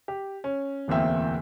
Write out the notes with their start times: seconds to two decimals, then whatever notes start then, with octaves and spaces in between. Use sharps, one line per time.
0.08 G4
0.44 C#4
0.88 D1 E2 A#3 C4 E5 G5